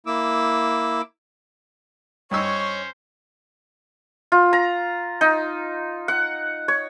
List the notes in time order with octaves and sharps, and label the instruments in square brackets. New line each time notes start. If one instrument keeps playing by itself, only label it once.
[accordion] A#3 E4 D6 E6
[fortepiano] G2 D#4 E6 [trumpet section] C#4 C5 [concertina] C#5 [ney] C#6
[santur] F4
A#5
D#4
F#5
C#5